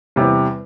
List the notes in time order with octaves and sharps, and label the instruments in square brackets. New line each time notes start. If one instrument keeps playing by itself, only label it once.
[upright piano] E2 C3 G3